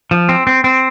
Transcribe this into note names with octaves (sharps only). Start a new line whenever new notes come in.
F3
C4
C4
C4